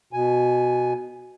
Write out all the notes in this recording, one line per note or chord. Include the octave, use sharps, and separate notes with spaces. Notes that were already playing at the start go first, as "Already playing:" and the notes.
B2 G#5